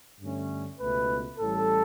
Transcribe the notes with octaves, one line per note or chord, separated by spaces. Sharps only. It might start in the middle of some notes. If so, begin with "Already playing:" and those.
G2 D3 A3 C#4
C#2 B2 A3 B4
A1 A2 G3 A4